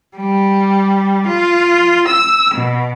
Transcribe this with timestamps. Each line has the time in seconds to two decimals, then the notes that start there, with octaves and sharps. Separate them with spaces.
0.17 G3
1.27 F4
2.08 E6
2.55 B2